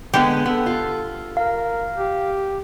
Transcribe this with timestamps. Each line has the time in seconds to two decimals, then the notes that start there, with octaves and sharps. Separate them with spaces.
0.14 D3 G#3 B3 G4
0.46 B3 A4
0.66 F4
1.37 A#4 F5
1.97 G4